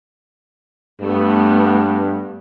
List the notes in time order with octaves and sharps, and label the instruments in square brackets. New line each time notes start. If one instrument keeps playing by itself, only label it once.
[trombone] G2 [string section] A3 B3